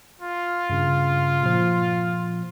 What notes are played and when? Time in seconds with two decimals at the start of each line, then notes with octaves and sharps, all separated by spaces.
0.22 F4
0.70 G2 C#3
1.43 A#2 F3